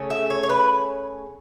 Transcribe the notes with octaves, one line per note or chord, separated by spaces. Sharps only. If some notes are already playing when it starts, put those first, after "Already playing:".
Already playing: C#3 A3 C#4
E5
C#5
C#5
B4